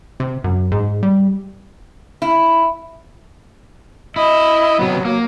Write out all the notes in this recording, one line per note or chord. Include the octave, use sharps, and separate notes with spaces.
C3
F#2
G#2
G3
E4
E4 D#5
C3 F#3 B3
F#3 A#3